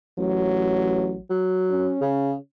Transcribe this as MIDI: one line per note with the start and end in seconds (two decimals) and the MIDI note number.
0.18 1.17 33
0.18 1.20 54
1.30 1.93 54
1.70 2.37 61
2.01 2.34 49